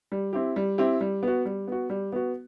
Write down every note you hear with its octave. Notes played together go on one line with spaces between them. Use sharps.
G3
C4 E4 G4
G3
C4 E4 G4
G3
B3 F#4
G3
B3 F#4
G3
B3 F#4